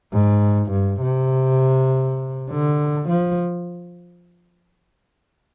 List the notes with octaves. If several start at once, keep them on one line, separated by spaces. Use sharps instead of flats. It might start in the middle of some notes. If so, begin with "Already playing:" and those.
G#2
G2
C3
D3
F3